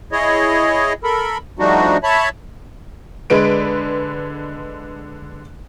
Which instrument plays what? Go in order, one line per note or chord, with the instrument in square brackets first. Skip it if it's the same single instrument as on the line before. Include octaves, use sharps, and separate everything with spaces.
[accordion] E4 G#4 C#5 D#5
A4 A#4 B5
F3 G3 A3 D4 D#4 F#4
C#5 E5 A5 B5
[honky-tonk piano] D3 G#3 B4 D7